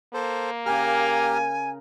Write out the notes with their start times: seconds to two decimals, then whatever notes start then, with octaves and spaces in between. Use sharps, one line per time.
0.14 A#3 A4 C5
0.66 C#3 G4 A#4 G#5 A#5 F6